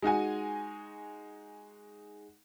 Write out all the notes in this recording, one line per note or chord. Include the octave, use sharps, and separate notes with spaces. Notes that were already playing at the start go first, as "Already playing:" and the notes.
G#3 D#4 F#4 G#5